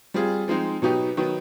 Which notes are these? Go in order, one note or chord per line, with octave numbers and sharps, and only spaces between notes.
G3 C4 F4 G#4
F3 G#3 C4 D#4
B2 F#3 B3 D#4 G4
D#3 F#3 B3